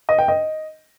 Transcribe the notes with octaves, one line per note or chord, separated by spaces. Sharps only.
D#5
G5
D#5